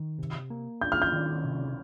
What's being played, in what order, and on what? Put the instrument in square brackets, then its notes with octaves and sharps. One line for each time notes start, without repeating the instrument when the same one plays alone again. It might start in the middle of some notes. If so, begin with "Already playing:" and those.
Already playing: [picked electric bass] D#3
C3
A#3
[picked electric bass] D4 [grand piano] G6
[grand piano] F6
G6
[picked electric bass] D#3
C3